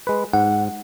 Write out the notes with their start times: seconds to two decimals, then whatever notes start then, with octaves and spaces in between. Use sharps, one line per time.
0.07 G#3 B4
0.33 G#2 F#5